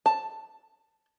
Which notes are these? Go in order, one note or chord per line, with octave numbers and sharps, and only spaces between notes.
A5